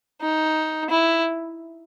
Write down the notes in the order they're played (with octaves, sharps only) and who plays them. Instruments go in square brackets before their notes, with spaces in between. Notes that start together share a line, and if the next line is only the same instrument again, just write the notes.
[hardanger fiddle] D#4
E4